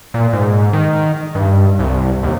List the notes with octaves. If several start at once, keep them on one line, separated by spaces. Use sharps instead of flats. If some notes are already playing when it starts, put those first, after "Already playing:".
A#2
G#2
D#3
G2
C2
D#2